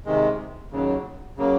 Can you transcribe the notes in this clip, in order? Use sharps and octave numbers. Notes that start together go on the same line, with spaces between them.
C3 D#3 G#3
D#2 C#3 F#3
C#3 F#3 A#3